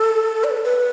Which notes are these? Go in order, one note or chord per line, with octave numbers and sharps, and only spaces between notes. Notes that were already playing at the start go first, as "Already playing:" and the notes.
Already playing: A4
D5
B4
A4
B4